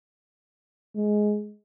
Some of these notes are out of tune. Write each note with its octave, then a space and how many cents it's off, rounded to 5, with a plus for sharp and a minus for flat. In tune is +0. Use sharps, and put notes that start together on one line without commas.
G#3 +10